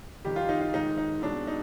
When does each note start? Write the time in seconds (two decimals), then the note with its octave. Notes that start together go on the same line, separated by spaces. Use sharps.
0.25 F2 D#3 G3 G4
0.36 F4
0.49 D#4
0.61 F4
0.73 G#2 D#3 G#3 D#4
0.98 D#4
1.22 C2 B2 G#3 D4
1.47 D#4